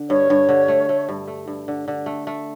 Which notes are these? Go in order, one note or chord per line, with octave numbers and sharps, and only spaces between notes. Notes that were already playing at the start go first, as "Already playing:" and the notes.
Already playing: D3
G2 C#5
G2
D3
A3
A3
G2
A3
G2
D3
D3
A3
A3